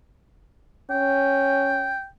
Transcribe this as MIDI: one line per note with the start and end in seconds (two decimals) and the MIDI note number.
0.90 1.95 61
0.90 2.06 79